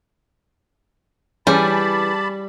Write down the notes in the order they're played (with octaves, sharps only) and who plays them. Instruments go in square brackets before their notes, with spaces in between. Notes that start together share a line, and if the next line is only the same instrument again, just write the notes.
[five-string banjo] E3 C#4 G#4 [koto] G3 [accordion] A5 B5 [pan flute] D6